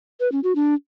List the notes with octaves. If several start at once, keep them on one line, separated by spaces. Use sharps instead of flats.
B4
C#4
F#4
D4